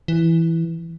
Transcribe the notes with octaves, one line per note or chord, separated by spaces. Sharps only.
E3